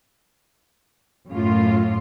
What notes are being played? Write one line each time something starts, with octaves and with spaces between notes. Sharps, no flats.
F#2 A2 F4